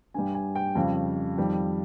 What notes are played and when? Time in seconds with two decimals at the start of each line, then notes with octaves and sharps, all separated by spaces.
0.14 G2 G3 G#5
0.34 G#5
0.55 G5
0.75 F2 C#3 G3 F5
1.37 F2 D#3 G3